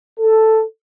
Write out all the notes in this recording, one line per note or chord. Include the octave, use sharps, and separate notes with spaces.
A4